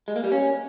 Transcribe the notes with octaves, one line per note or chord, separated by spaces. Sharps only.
G#3
A#3
G3
C#4